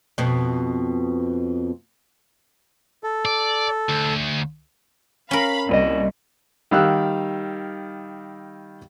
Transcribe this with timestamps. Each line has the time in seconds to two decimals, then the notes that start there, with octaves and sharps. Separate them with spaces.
0.18 F2 B2
3.04 A4
3.25 D5
3.89 D2
5.31 C#4 A#4 F5 B5
5.69 C2 A#2 B4 D#5
6.71 D#3 G3 F5 E6 F#6